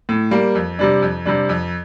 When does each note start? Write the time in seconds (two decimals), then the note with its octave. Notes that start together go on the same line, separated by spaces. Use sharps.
0.09 A2
0.31 G3 A#3
0.55 F2
0.79 C3 G3 D4
1.02 F2
1.26 C3 G3 D4
1.49 F2